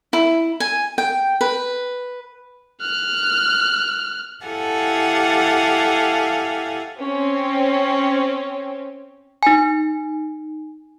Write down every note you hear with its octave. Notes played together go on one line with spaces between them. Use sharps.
E4
G#5
G5
B4
F6 F#6
E4 G4 A4 F5 F#5 G#5
C4 C#4 C#5
D#4 G#5